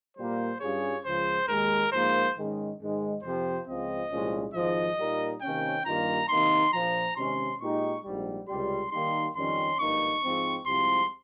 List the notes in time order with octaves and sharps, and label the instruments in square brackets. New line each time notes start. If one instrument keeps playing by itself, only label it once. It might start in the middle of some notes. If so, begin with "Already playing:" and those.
[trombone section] A#2 G3 A#3 [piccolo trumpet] C5
[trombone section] G2 G3 C#4 F4 G#4 [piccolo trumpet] C#5
[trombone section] C#2 C#3 F3 [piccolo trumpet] C5
[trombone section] D#2 D#3 G#3 [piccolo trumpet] A#4
[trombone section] G#2 F3 A#3 [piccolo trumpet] C5
[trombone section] G#2 D#3 G#3 C#4
G#2 D#3 G#3
[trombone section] F2 C3 F3 C4 G4 [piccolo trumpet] C5
[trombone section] C#2 C#3 F3 C4 [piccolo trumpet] D#5
[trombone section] C2 A#2 F3 G#3 C#4
[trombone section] G#1 G#2 F3 [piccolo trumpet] D#5
[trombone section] A#2 G3 A#3 D#4 A#4
[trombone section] C3 D#3 A#3 C#4 [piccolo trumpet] G5
[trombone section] G2 D#3 G3 A#3 F4 [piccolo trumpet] A#5
[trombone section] C3 D#3 A#3 D#4 [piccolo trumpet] C6
[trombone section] A#1 A#2 F3 [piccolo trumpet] A#5
[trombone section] C3 D#3 G#3 C#4 [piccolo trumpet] C6
[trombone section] A#2 G#3 D#4 G4 [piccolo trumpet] C#6
[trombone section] A#1 G#2 G3
[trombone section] C#2 C3 G3 [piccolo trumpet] C6
[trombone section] D#3 G3 A#3 D#4 G4 [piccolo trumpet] C6
[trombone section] F2 D#3 G3 C#4 [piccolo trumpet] C6
[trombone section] G#1 G2 F3 A#3 D#4 [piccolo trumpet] C#6
[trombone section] G#2 F3 G#3 C4
[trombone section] C2 C3 F3 G#3 C4 [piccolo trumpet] C6